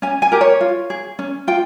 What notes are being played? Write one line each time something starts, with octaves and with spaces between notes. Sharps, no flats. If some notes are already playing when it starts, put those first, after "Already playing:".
C#4 G#5
G#5
G4 A#4
C#5
F4
G#4
C#4
F4 G5